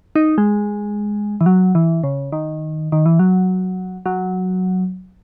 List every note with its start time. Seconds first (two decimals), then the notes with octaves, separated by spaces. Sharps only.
0.16 D#4
0.38 G#3
1.41 E3
1.46 F#3
1.75 E3
2.04 C#3
2.32 D#3
2.92 D#3
3.06 E3
3.19 F#3
4.06 F#3